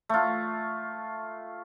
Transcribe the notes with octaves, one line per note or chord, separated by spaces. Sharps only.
A3 F4